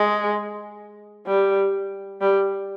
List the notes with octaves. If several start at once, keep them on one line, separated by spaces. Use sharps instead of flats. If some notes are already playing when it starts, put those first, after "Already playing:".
Already playing: G#3
G3
G3